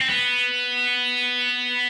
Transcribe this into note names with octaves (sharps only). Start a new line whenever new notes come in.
C4
B3